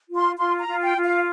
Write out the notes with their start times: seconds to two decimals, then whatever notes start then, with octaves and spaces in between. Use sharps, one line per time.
0.09 F4
0.16 C6
0.37 F4 C6
0.59 A#5
0.67 F4
0.82 G5
0.97 F4
1.04 F5